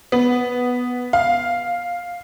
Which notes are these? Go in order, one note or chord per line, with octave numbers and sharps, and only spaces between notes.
B3
F5